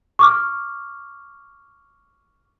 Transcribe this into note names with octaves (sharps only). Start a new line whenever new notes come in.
C#6 D6 F6